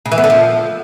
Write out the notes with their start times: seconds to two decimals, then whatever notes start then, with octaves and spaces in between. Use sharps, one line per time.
0.06 C#3
0.12 E3
0.18 B3
0.24 D3
0.30 F3